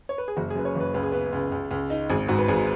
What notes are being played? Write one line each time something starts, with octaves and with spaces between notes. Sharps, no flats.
C#5
B4
G#4
F#1 F#4
G#4
F#2 B4
C#5
F#1 B4
C#2 B4
G#4
B3 B4
C#2
C#2
C#2
D#4
G#1 G#4
G#2 F#4
B4
G#1 G#4